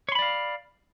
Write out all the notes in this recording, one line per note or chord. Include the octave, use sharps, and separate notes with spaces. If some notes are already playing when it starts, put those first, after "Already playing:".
C#5 D5 F5 B5 C6